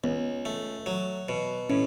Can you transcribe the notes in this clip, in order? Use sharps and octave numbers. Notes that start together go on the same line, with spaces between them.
C#2 B3
A3
F#3
B2
A2 C#4